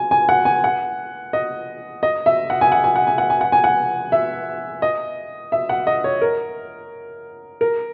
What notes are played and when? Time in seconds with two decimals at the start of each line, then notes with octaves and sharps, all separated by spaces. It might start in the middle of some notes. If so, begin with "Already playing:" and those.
Already playing: G#5
0.11 G#5
0.29 F#5
0.45 G#5
0.64 F#5
1.33 D#5
2.03 D#5
2.26 E5
2.50 F#5
2.61 G#5
2.72 F#5
2.84 G#5
2.96 F#5
3.07 G#5
3.18 F#5
3.30 G#5
3.41 F#5
3.52 G#5
3.64 F#5
4.12 E5
4.82 D#5
5.52 E5
5.69 F#5
5.87 D#5
6.04 C#5
6.22 A#4
7.61 A#4